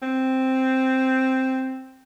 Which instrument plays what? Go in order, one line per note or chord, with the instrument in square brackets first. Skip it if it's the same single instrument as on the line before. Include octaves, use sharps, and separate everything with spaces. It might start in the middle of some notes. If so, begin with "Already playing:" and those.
[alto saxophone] C4